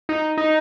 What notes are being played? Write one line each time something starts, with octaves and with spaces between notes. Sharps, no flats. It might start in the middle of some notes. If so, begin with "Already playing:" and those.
D#4
D#4